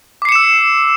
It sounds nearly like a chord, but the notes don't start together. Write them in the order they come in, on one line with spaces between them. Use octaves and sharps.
D6 C7 C#7 E7 E6